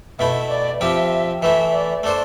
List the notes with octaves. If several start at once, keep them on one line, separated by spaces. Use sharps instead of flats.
B2 A3 E4 E5
D5
F3 C4 G4 E5
E3 A3 E4 E5
D5
A3 D4 A4 C5